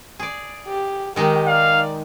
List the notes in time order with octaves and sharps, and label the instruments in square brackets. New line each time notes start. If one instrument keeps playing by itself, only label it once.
[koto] G#4 D5
[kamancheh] G4
[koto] D#3 G#3 D#4 [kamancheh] G4 A#4
[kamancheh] D5 [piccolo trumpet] F5